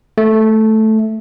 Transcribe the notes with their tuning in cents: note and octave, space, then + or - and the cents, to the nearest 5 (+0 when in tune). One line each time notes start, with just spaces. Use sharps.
A3 -5